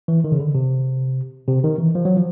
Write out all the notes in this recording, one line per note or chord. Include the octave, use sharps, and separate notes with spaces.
E3
D#3
C#3
D3
C3
C3
D#3
E3
F3
F#3
F3